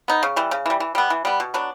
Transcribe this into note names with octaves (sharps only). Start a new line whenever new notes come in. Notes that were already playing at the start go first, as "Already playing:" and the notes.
B3 D#4
C#3
E3 G3
C#3
E3 G3
E3
G3 B3
E3
G3 B3
B2
F#3 B3 D4